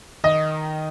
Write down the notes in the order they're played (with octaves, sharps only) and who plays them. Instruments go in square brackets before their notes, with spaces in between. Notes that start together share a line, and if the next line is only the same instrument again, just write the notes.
[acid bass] D#3 [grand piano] D#5